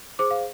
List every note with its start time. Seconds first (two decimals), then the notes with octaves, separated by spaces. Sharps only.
0.19 G#4 C5 D6
0.31 F5